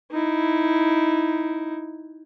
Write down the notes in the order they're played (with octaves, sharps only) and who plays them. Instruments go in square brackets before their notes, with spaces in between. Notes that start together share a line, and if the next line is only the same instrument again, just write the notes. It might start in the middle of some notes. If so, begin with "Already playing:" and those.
[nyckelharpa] D#4 E4